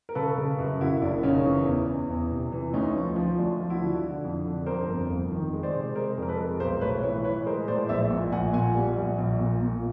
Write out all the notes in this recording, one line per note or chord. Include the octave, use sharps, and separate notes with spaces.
A#4
C#3 A4 B4
C#3
F#2
C#3 E4 F#4
F#1 D4 E4
C#3 C#4 D#4
E3
E2
E2
E2
C3
E3
D2 C#4 D#4
F3
F3
D2 D4
F3
E4 F#4
D3
D3
F2
D3
F2 A#4 C5
G1
F2
D#3
G#3
C5 D5
C3
G#3 A#4 C5
F2
A#4
A4 B4
G#3
B1 A#4 C5
A2 B4 C#5
E3 B4 C#5
E3 B4 C#5
G#3 A#4 C5
A2 C5 D5
A#1 D5 E5
A#2
A#1 F#5 G#5
A#2 F#5 G#5
G3
A#1
A#1
A#2
A#2